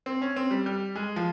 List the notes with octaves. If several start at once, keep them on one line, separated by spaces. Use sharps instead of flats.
C4
C#4
C4
G3
G3
G#3
F3